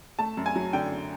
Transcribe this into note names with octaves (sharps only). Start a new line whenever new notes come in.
A3 A5
F#2
G#5
F#3
D3 G5